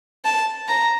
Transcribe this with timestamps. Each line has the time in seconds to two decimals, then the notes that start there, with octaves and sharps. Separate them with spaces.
0.25 A5
0.68 A#5